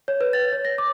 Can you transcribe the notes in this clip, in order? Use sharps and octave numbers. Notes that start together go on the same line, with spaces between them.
C#5
B4
A6
C#5
A#6
D6